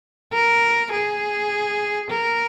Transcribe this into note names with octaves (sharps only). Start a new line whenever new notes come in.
A#4
G#4
A#4